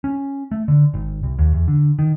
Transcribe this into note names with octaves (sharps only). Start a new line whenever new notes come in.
C#4
A3
D3
G#1
C2
D#2
E2
D3
D#3